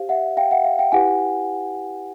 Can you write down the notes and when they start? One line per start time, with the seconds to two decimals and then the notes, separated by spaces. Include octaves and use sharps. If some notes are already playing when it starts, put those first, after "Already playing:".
Already playing: G4 C5 F5
0.09 E5 F#5
0.37 F5 G5
0.51 E5 F#5
0.64 F5
0.79 F5 G5
0.92 E4 G4 B4 F#5 G#5